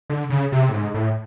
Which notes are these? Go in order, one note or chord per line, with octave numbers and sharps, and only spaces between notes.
D3
C#3
C3
A2
G#2
A2